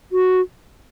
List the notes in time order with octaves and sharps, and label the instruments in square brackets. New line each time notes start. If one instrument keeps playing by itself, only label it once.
[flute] F#4